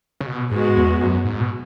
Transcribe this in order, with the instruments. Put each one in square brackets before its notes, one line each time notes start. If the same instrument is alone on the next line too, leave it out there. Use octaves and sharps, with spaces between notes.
[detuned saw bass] C#3
B2
[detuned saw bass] G#2 [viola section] G#3 B3 F#4
[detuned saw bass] E2
F#2
G#2
B2